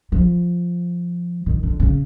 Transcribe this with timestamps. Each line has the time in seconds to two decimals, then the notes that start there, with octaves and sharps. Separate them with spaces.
0.12 F3
1.46 D#3
1.63 D3
1.80 C#3